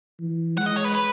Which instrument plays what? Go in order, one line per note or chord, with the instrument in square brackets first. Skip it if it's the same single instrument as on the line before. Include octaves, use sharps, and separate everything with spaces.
[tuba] E3
[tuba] G#3 [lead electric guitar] F#5
[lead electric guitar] D#5
C#5
B4
B4